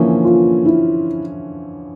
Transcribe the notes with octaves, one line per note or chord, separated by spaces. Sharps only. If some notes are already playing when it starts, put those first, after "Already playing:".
Already playing: D3 E3 F3 A#3 C#4
F4
E4